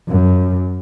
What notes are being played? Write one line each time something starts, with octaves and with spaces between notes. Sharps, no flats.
F#2